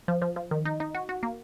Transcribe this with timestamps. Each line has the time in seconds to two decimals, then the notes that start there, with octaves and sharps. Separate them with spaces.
0.08 F3
0.22 F3
0.36 F3
0.51 D#3
0.65 D#4
0.80 D#4
0.95 F#4
1.09 F#4
1.23 A#3